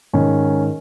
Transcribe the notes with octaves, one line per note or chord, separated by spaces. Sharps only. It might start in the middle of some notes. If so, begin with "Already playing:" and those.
G#2 D#3 C#4